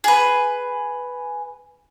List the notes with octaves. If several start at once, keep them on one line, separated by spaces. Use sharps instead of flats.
G#4 B4